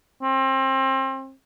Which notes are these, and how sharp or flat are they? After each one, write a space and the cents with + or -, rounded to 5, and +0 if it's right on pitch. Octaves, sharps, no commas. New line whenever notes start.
C4 +30